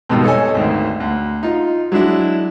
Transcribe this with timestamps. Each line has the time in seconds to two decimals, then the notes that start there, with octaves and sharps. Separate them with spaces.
0.09 F2 G#2 B2 D#3 G3
0.24 A4 C#5 D#5 G#5
0.55 G#1 D2 D#3
1.00 D2
1.43 D#4 F4
1.92 F#3 G#3 D4 E4